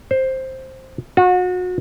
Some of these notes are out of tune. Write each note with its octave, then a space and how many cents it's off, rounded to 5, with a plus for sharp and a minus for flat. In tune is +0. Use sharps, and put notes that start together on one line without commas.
C5 +10
F#4 -30